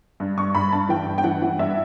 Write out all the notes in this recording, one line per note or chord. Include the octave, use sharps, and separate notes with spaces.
G2
G2 C#6
G2 B5
G2 A5
E3 G5
G2
G5
E3 F#5
E3
G2 E5